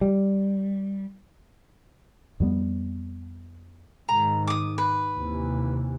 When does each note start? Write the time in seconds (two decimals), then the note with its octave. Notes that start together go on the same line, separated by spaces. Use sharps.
0.01 G3
2.40 F2 E3 G3 B3
4.09 G#2 D#3 A#5
4.47 D6 D#6
4.78 B4
5.15 D#2 C3 E3